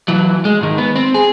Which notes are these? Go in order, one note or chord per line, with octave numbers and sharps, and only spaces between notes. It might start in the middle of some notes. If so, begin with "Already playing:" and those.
E3 F#3
G#3
G#2 D#3
B3
C4
G#4